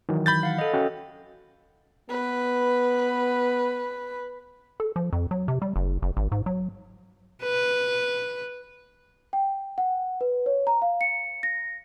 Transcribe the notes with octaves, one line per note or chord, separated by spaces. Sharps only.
D#3 E3 F#3
B5 G6 A6
F5 F#5
A4 D#5
C#4 F#4 G5
B3 B4
A4
F3
F2
F#3
C3
G3
F#1
F#1
G#1
G#2
F#3
B4
G5
F#5
B4
C#5
A#5
F5
C#7
A#6